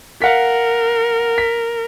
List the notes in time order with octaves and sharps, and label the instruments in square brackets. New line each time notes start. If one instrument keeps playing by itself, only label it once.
[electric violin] A#4 [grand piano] F5 F#5 B6
[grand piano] B6